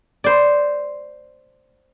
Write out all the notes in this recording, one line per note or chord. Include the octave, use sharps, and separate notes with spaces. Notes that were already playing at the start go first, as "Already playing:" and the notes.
C5 D5